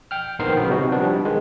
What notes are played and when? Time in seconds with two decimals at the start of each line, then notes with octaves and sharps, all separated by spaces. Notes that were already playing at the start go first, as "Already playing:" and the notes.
0.11 G5 F6
0.39 A#1 D#3 B3 A#4 C5 C7
0.57 C#3 F#3 B3
0.70 C3 C4 D#4 F#4
0.92 F3 G3 B3 D4
1.25 D#3 G#3